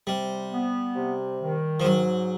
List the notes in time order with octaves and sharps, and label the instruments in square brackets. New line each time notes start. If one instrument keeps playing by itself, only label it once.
[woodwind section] C3 [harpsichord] G3
[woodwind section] B3
C3
D#3
[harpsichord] F3
[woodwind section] G#2 [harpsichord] F#3